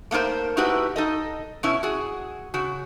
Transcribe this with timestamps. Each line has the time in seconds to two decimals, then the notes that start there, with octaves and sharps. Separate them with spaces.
0.11 A3 A#3 D#4 A#4 C5
0.57 A2 D#4 E4 F#4 G4 B4
0.96 D#4 A4 D#5
1.63 B2 C#4 E4
1.83 F#4 G#4
2.54 C#3 F#4